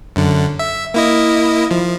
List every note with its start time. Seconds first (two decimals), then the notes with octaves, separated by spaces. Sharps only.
0.16 F#2 D3
0.59 E5
0.94 A#3 E4 D#5
1.71 F3